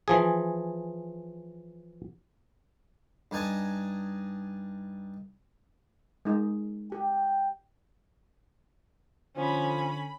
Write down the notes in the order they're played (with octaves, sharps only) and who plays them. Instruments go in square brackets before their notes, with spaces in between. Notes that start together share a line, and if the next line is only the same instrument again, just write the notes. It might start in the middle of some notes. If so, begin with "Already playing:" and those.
[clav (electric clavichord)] E3 F3 G#4
[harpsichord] G2 D#4 G#5 A5
[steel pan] G#3 D#4
[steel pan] G4 [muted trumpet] G5
[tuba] D3 [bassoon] F3 [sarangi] C#4 [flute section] B5